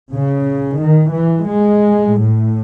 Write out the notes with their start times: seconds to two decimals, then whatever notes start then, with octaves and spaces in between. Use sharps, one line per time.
0.12 C#3
0.80 D#3
1.13 E3
1.47 G#3
2.15 A2